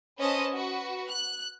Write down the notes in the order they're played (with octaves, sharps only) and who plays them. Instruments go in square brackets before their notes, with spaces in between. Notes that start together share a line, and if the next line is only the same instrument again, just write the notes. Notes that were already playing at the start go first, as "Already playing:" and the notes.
[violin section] C#4 B4 C5 D#5 A5
F#4 B4
F#6